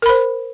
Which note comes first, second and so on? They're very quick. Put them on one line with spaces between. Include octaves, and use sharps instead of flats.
A#4 B5 C5